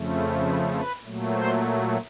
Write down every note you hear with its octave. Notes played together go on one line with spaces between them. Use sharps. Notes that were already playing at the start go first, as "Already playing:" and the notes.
Already playing: F2 C#3 F3 A3
A4
B4
B4
A#2 F#3 A3
C5